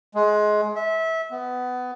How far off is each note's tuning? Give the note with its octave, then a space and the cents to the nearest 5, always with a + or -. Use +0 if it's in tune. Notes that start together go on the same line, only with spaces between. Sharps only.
G#3 +20
E5 -25
B3 +20